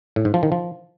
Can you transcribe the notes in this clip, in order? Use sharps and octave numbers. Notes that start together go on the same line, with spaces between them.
A2
G#2
F3
D#3
F3